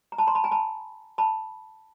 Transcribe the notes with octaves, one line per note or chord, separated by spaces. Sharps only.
A#5
A5 B5
A#5 C6
A5 B5
G#5 A#5
A5 B5
A5 B5